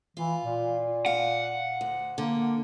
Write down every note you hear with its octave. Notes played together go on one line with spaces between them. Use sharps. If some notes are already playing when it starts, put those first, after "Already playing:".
E3 F4
A#2
F5 F#5
D2
D3 A#3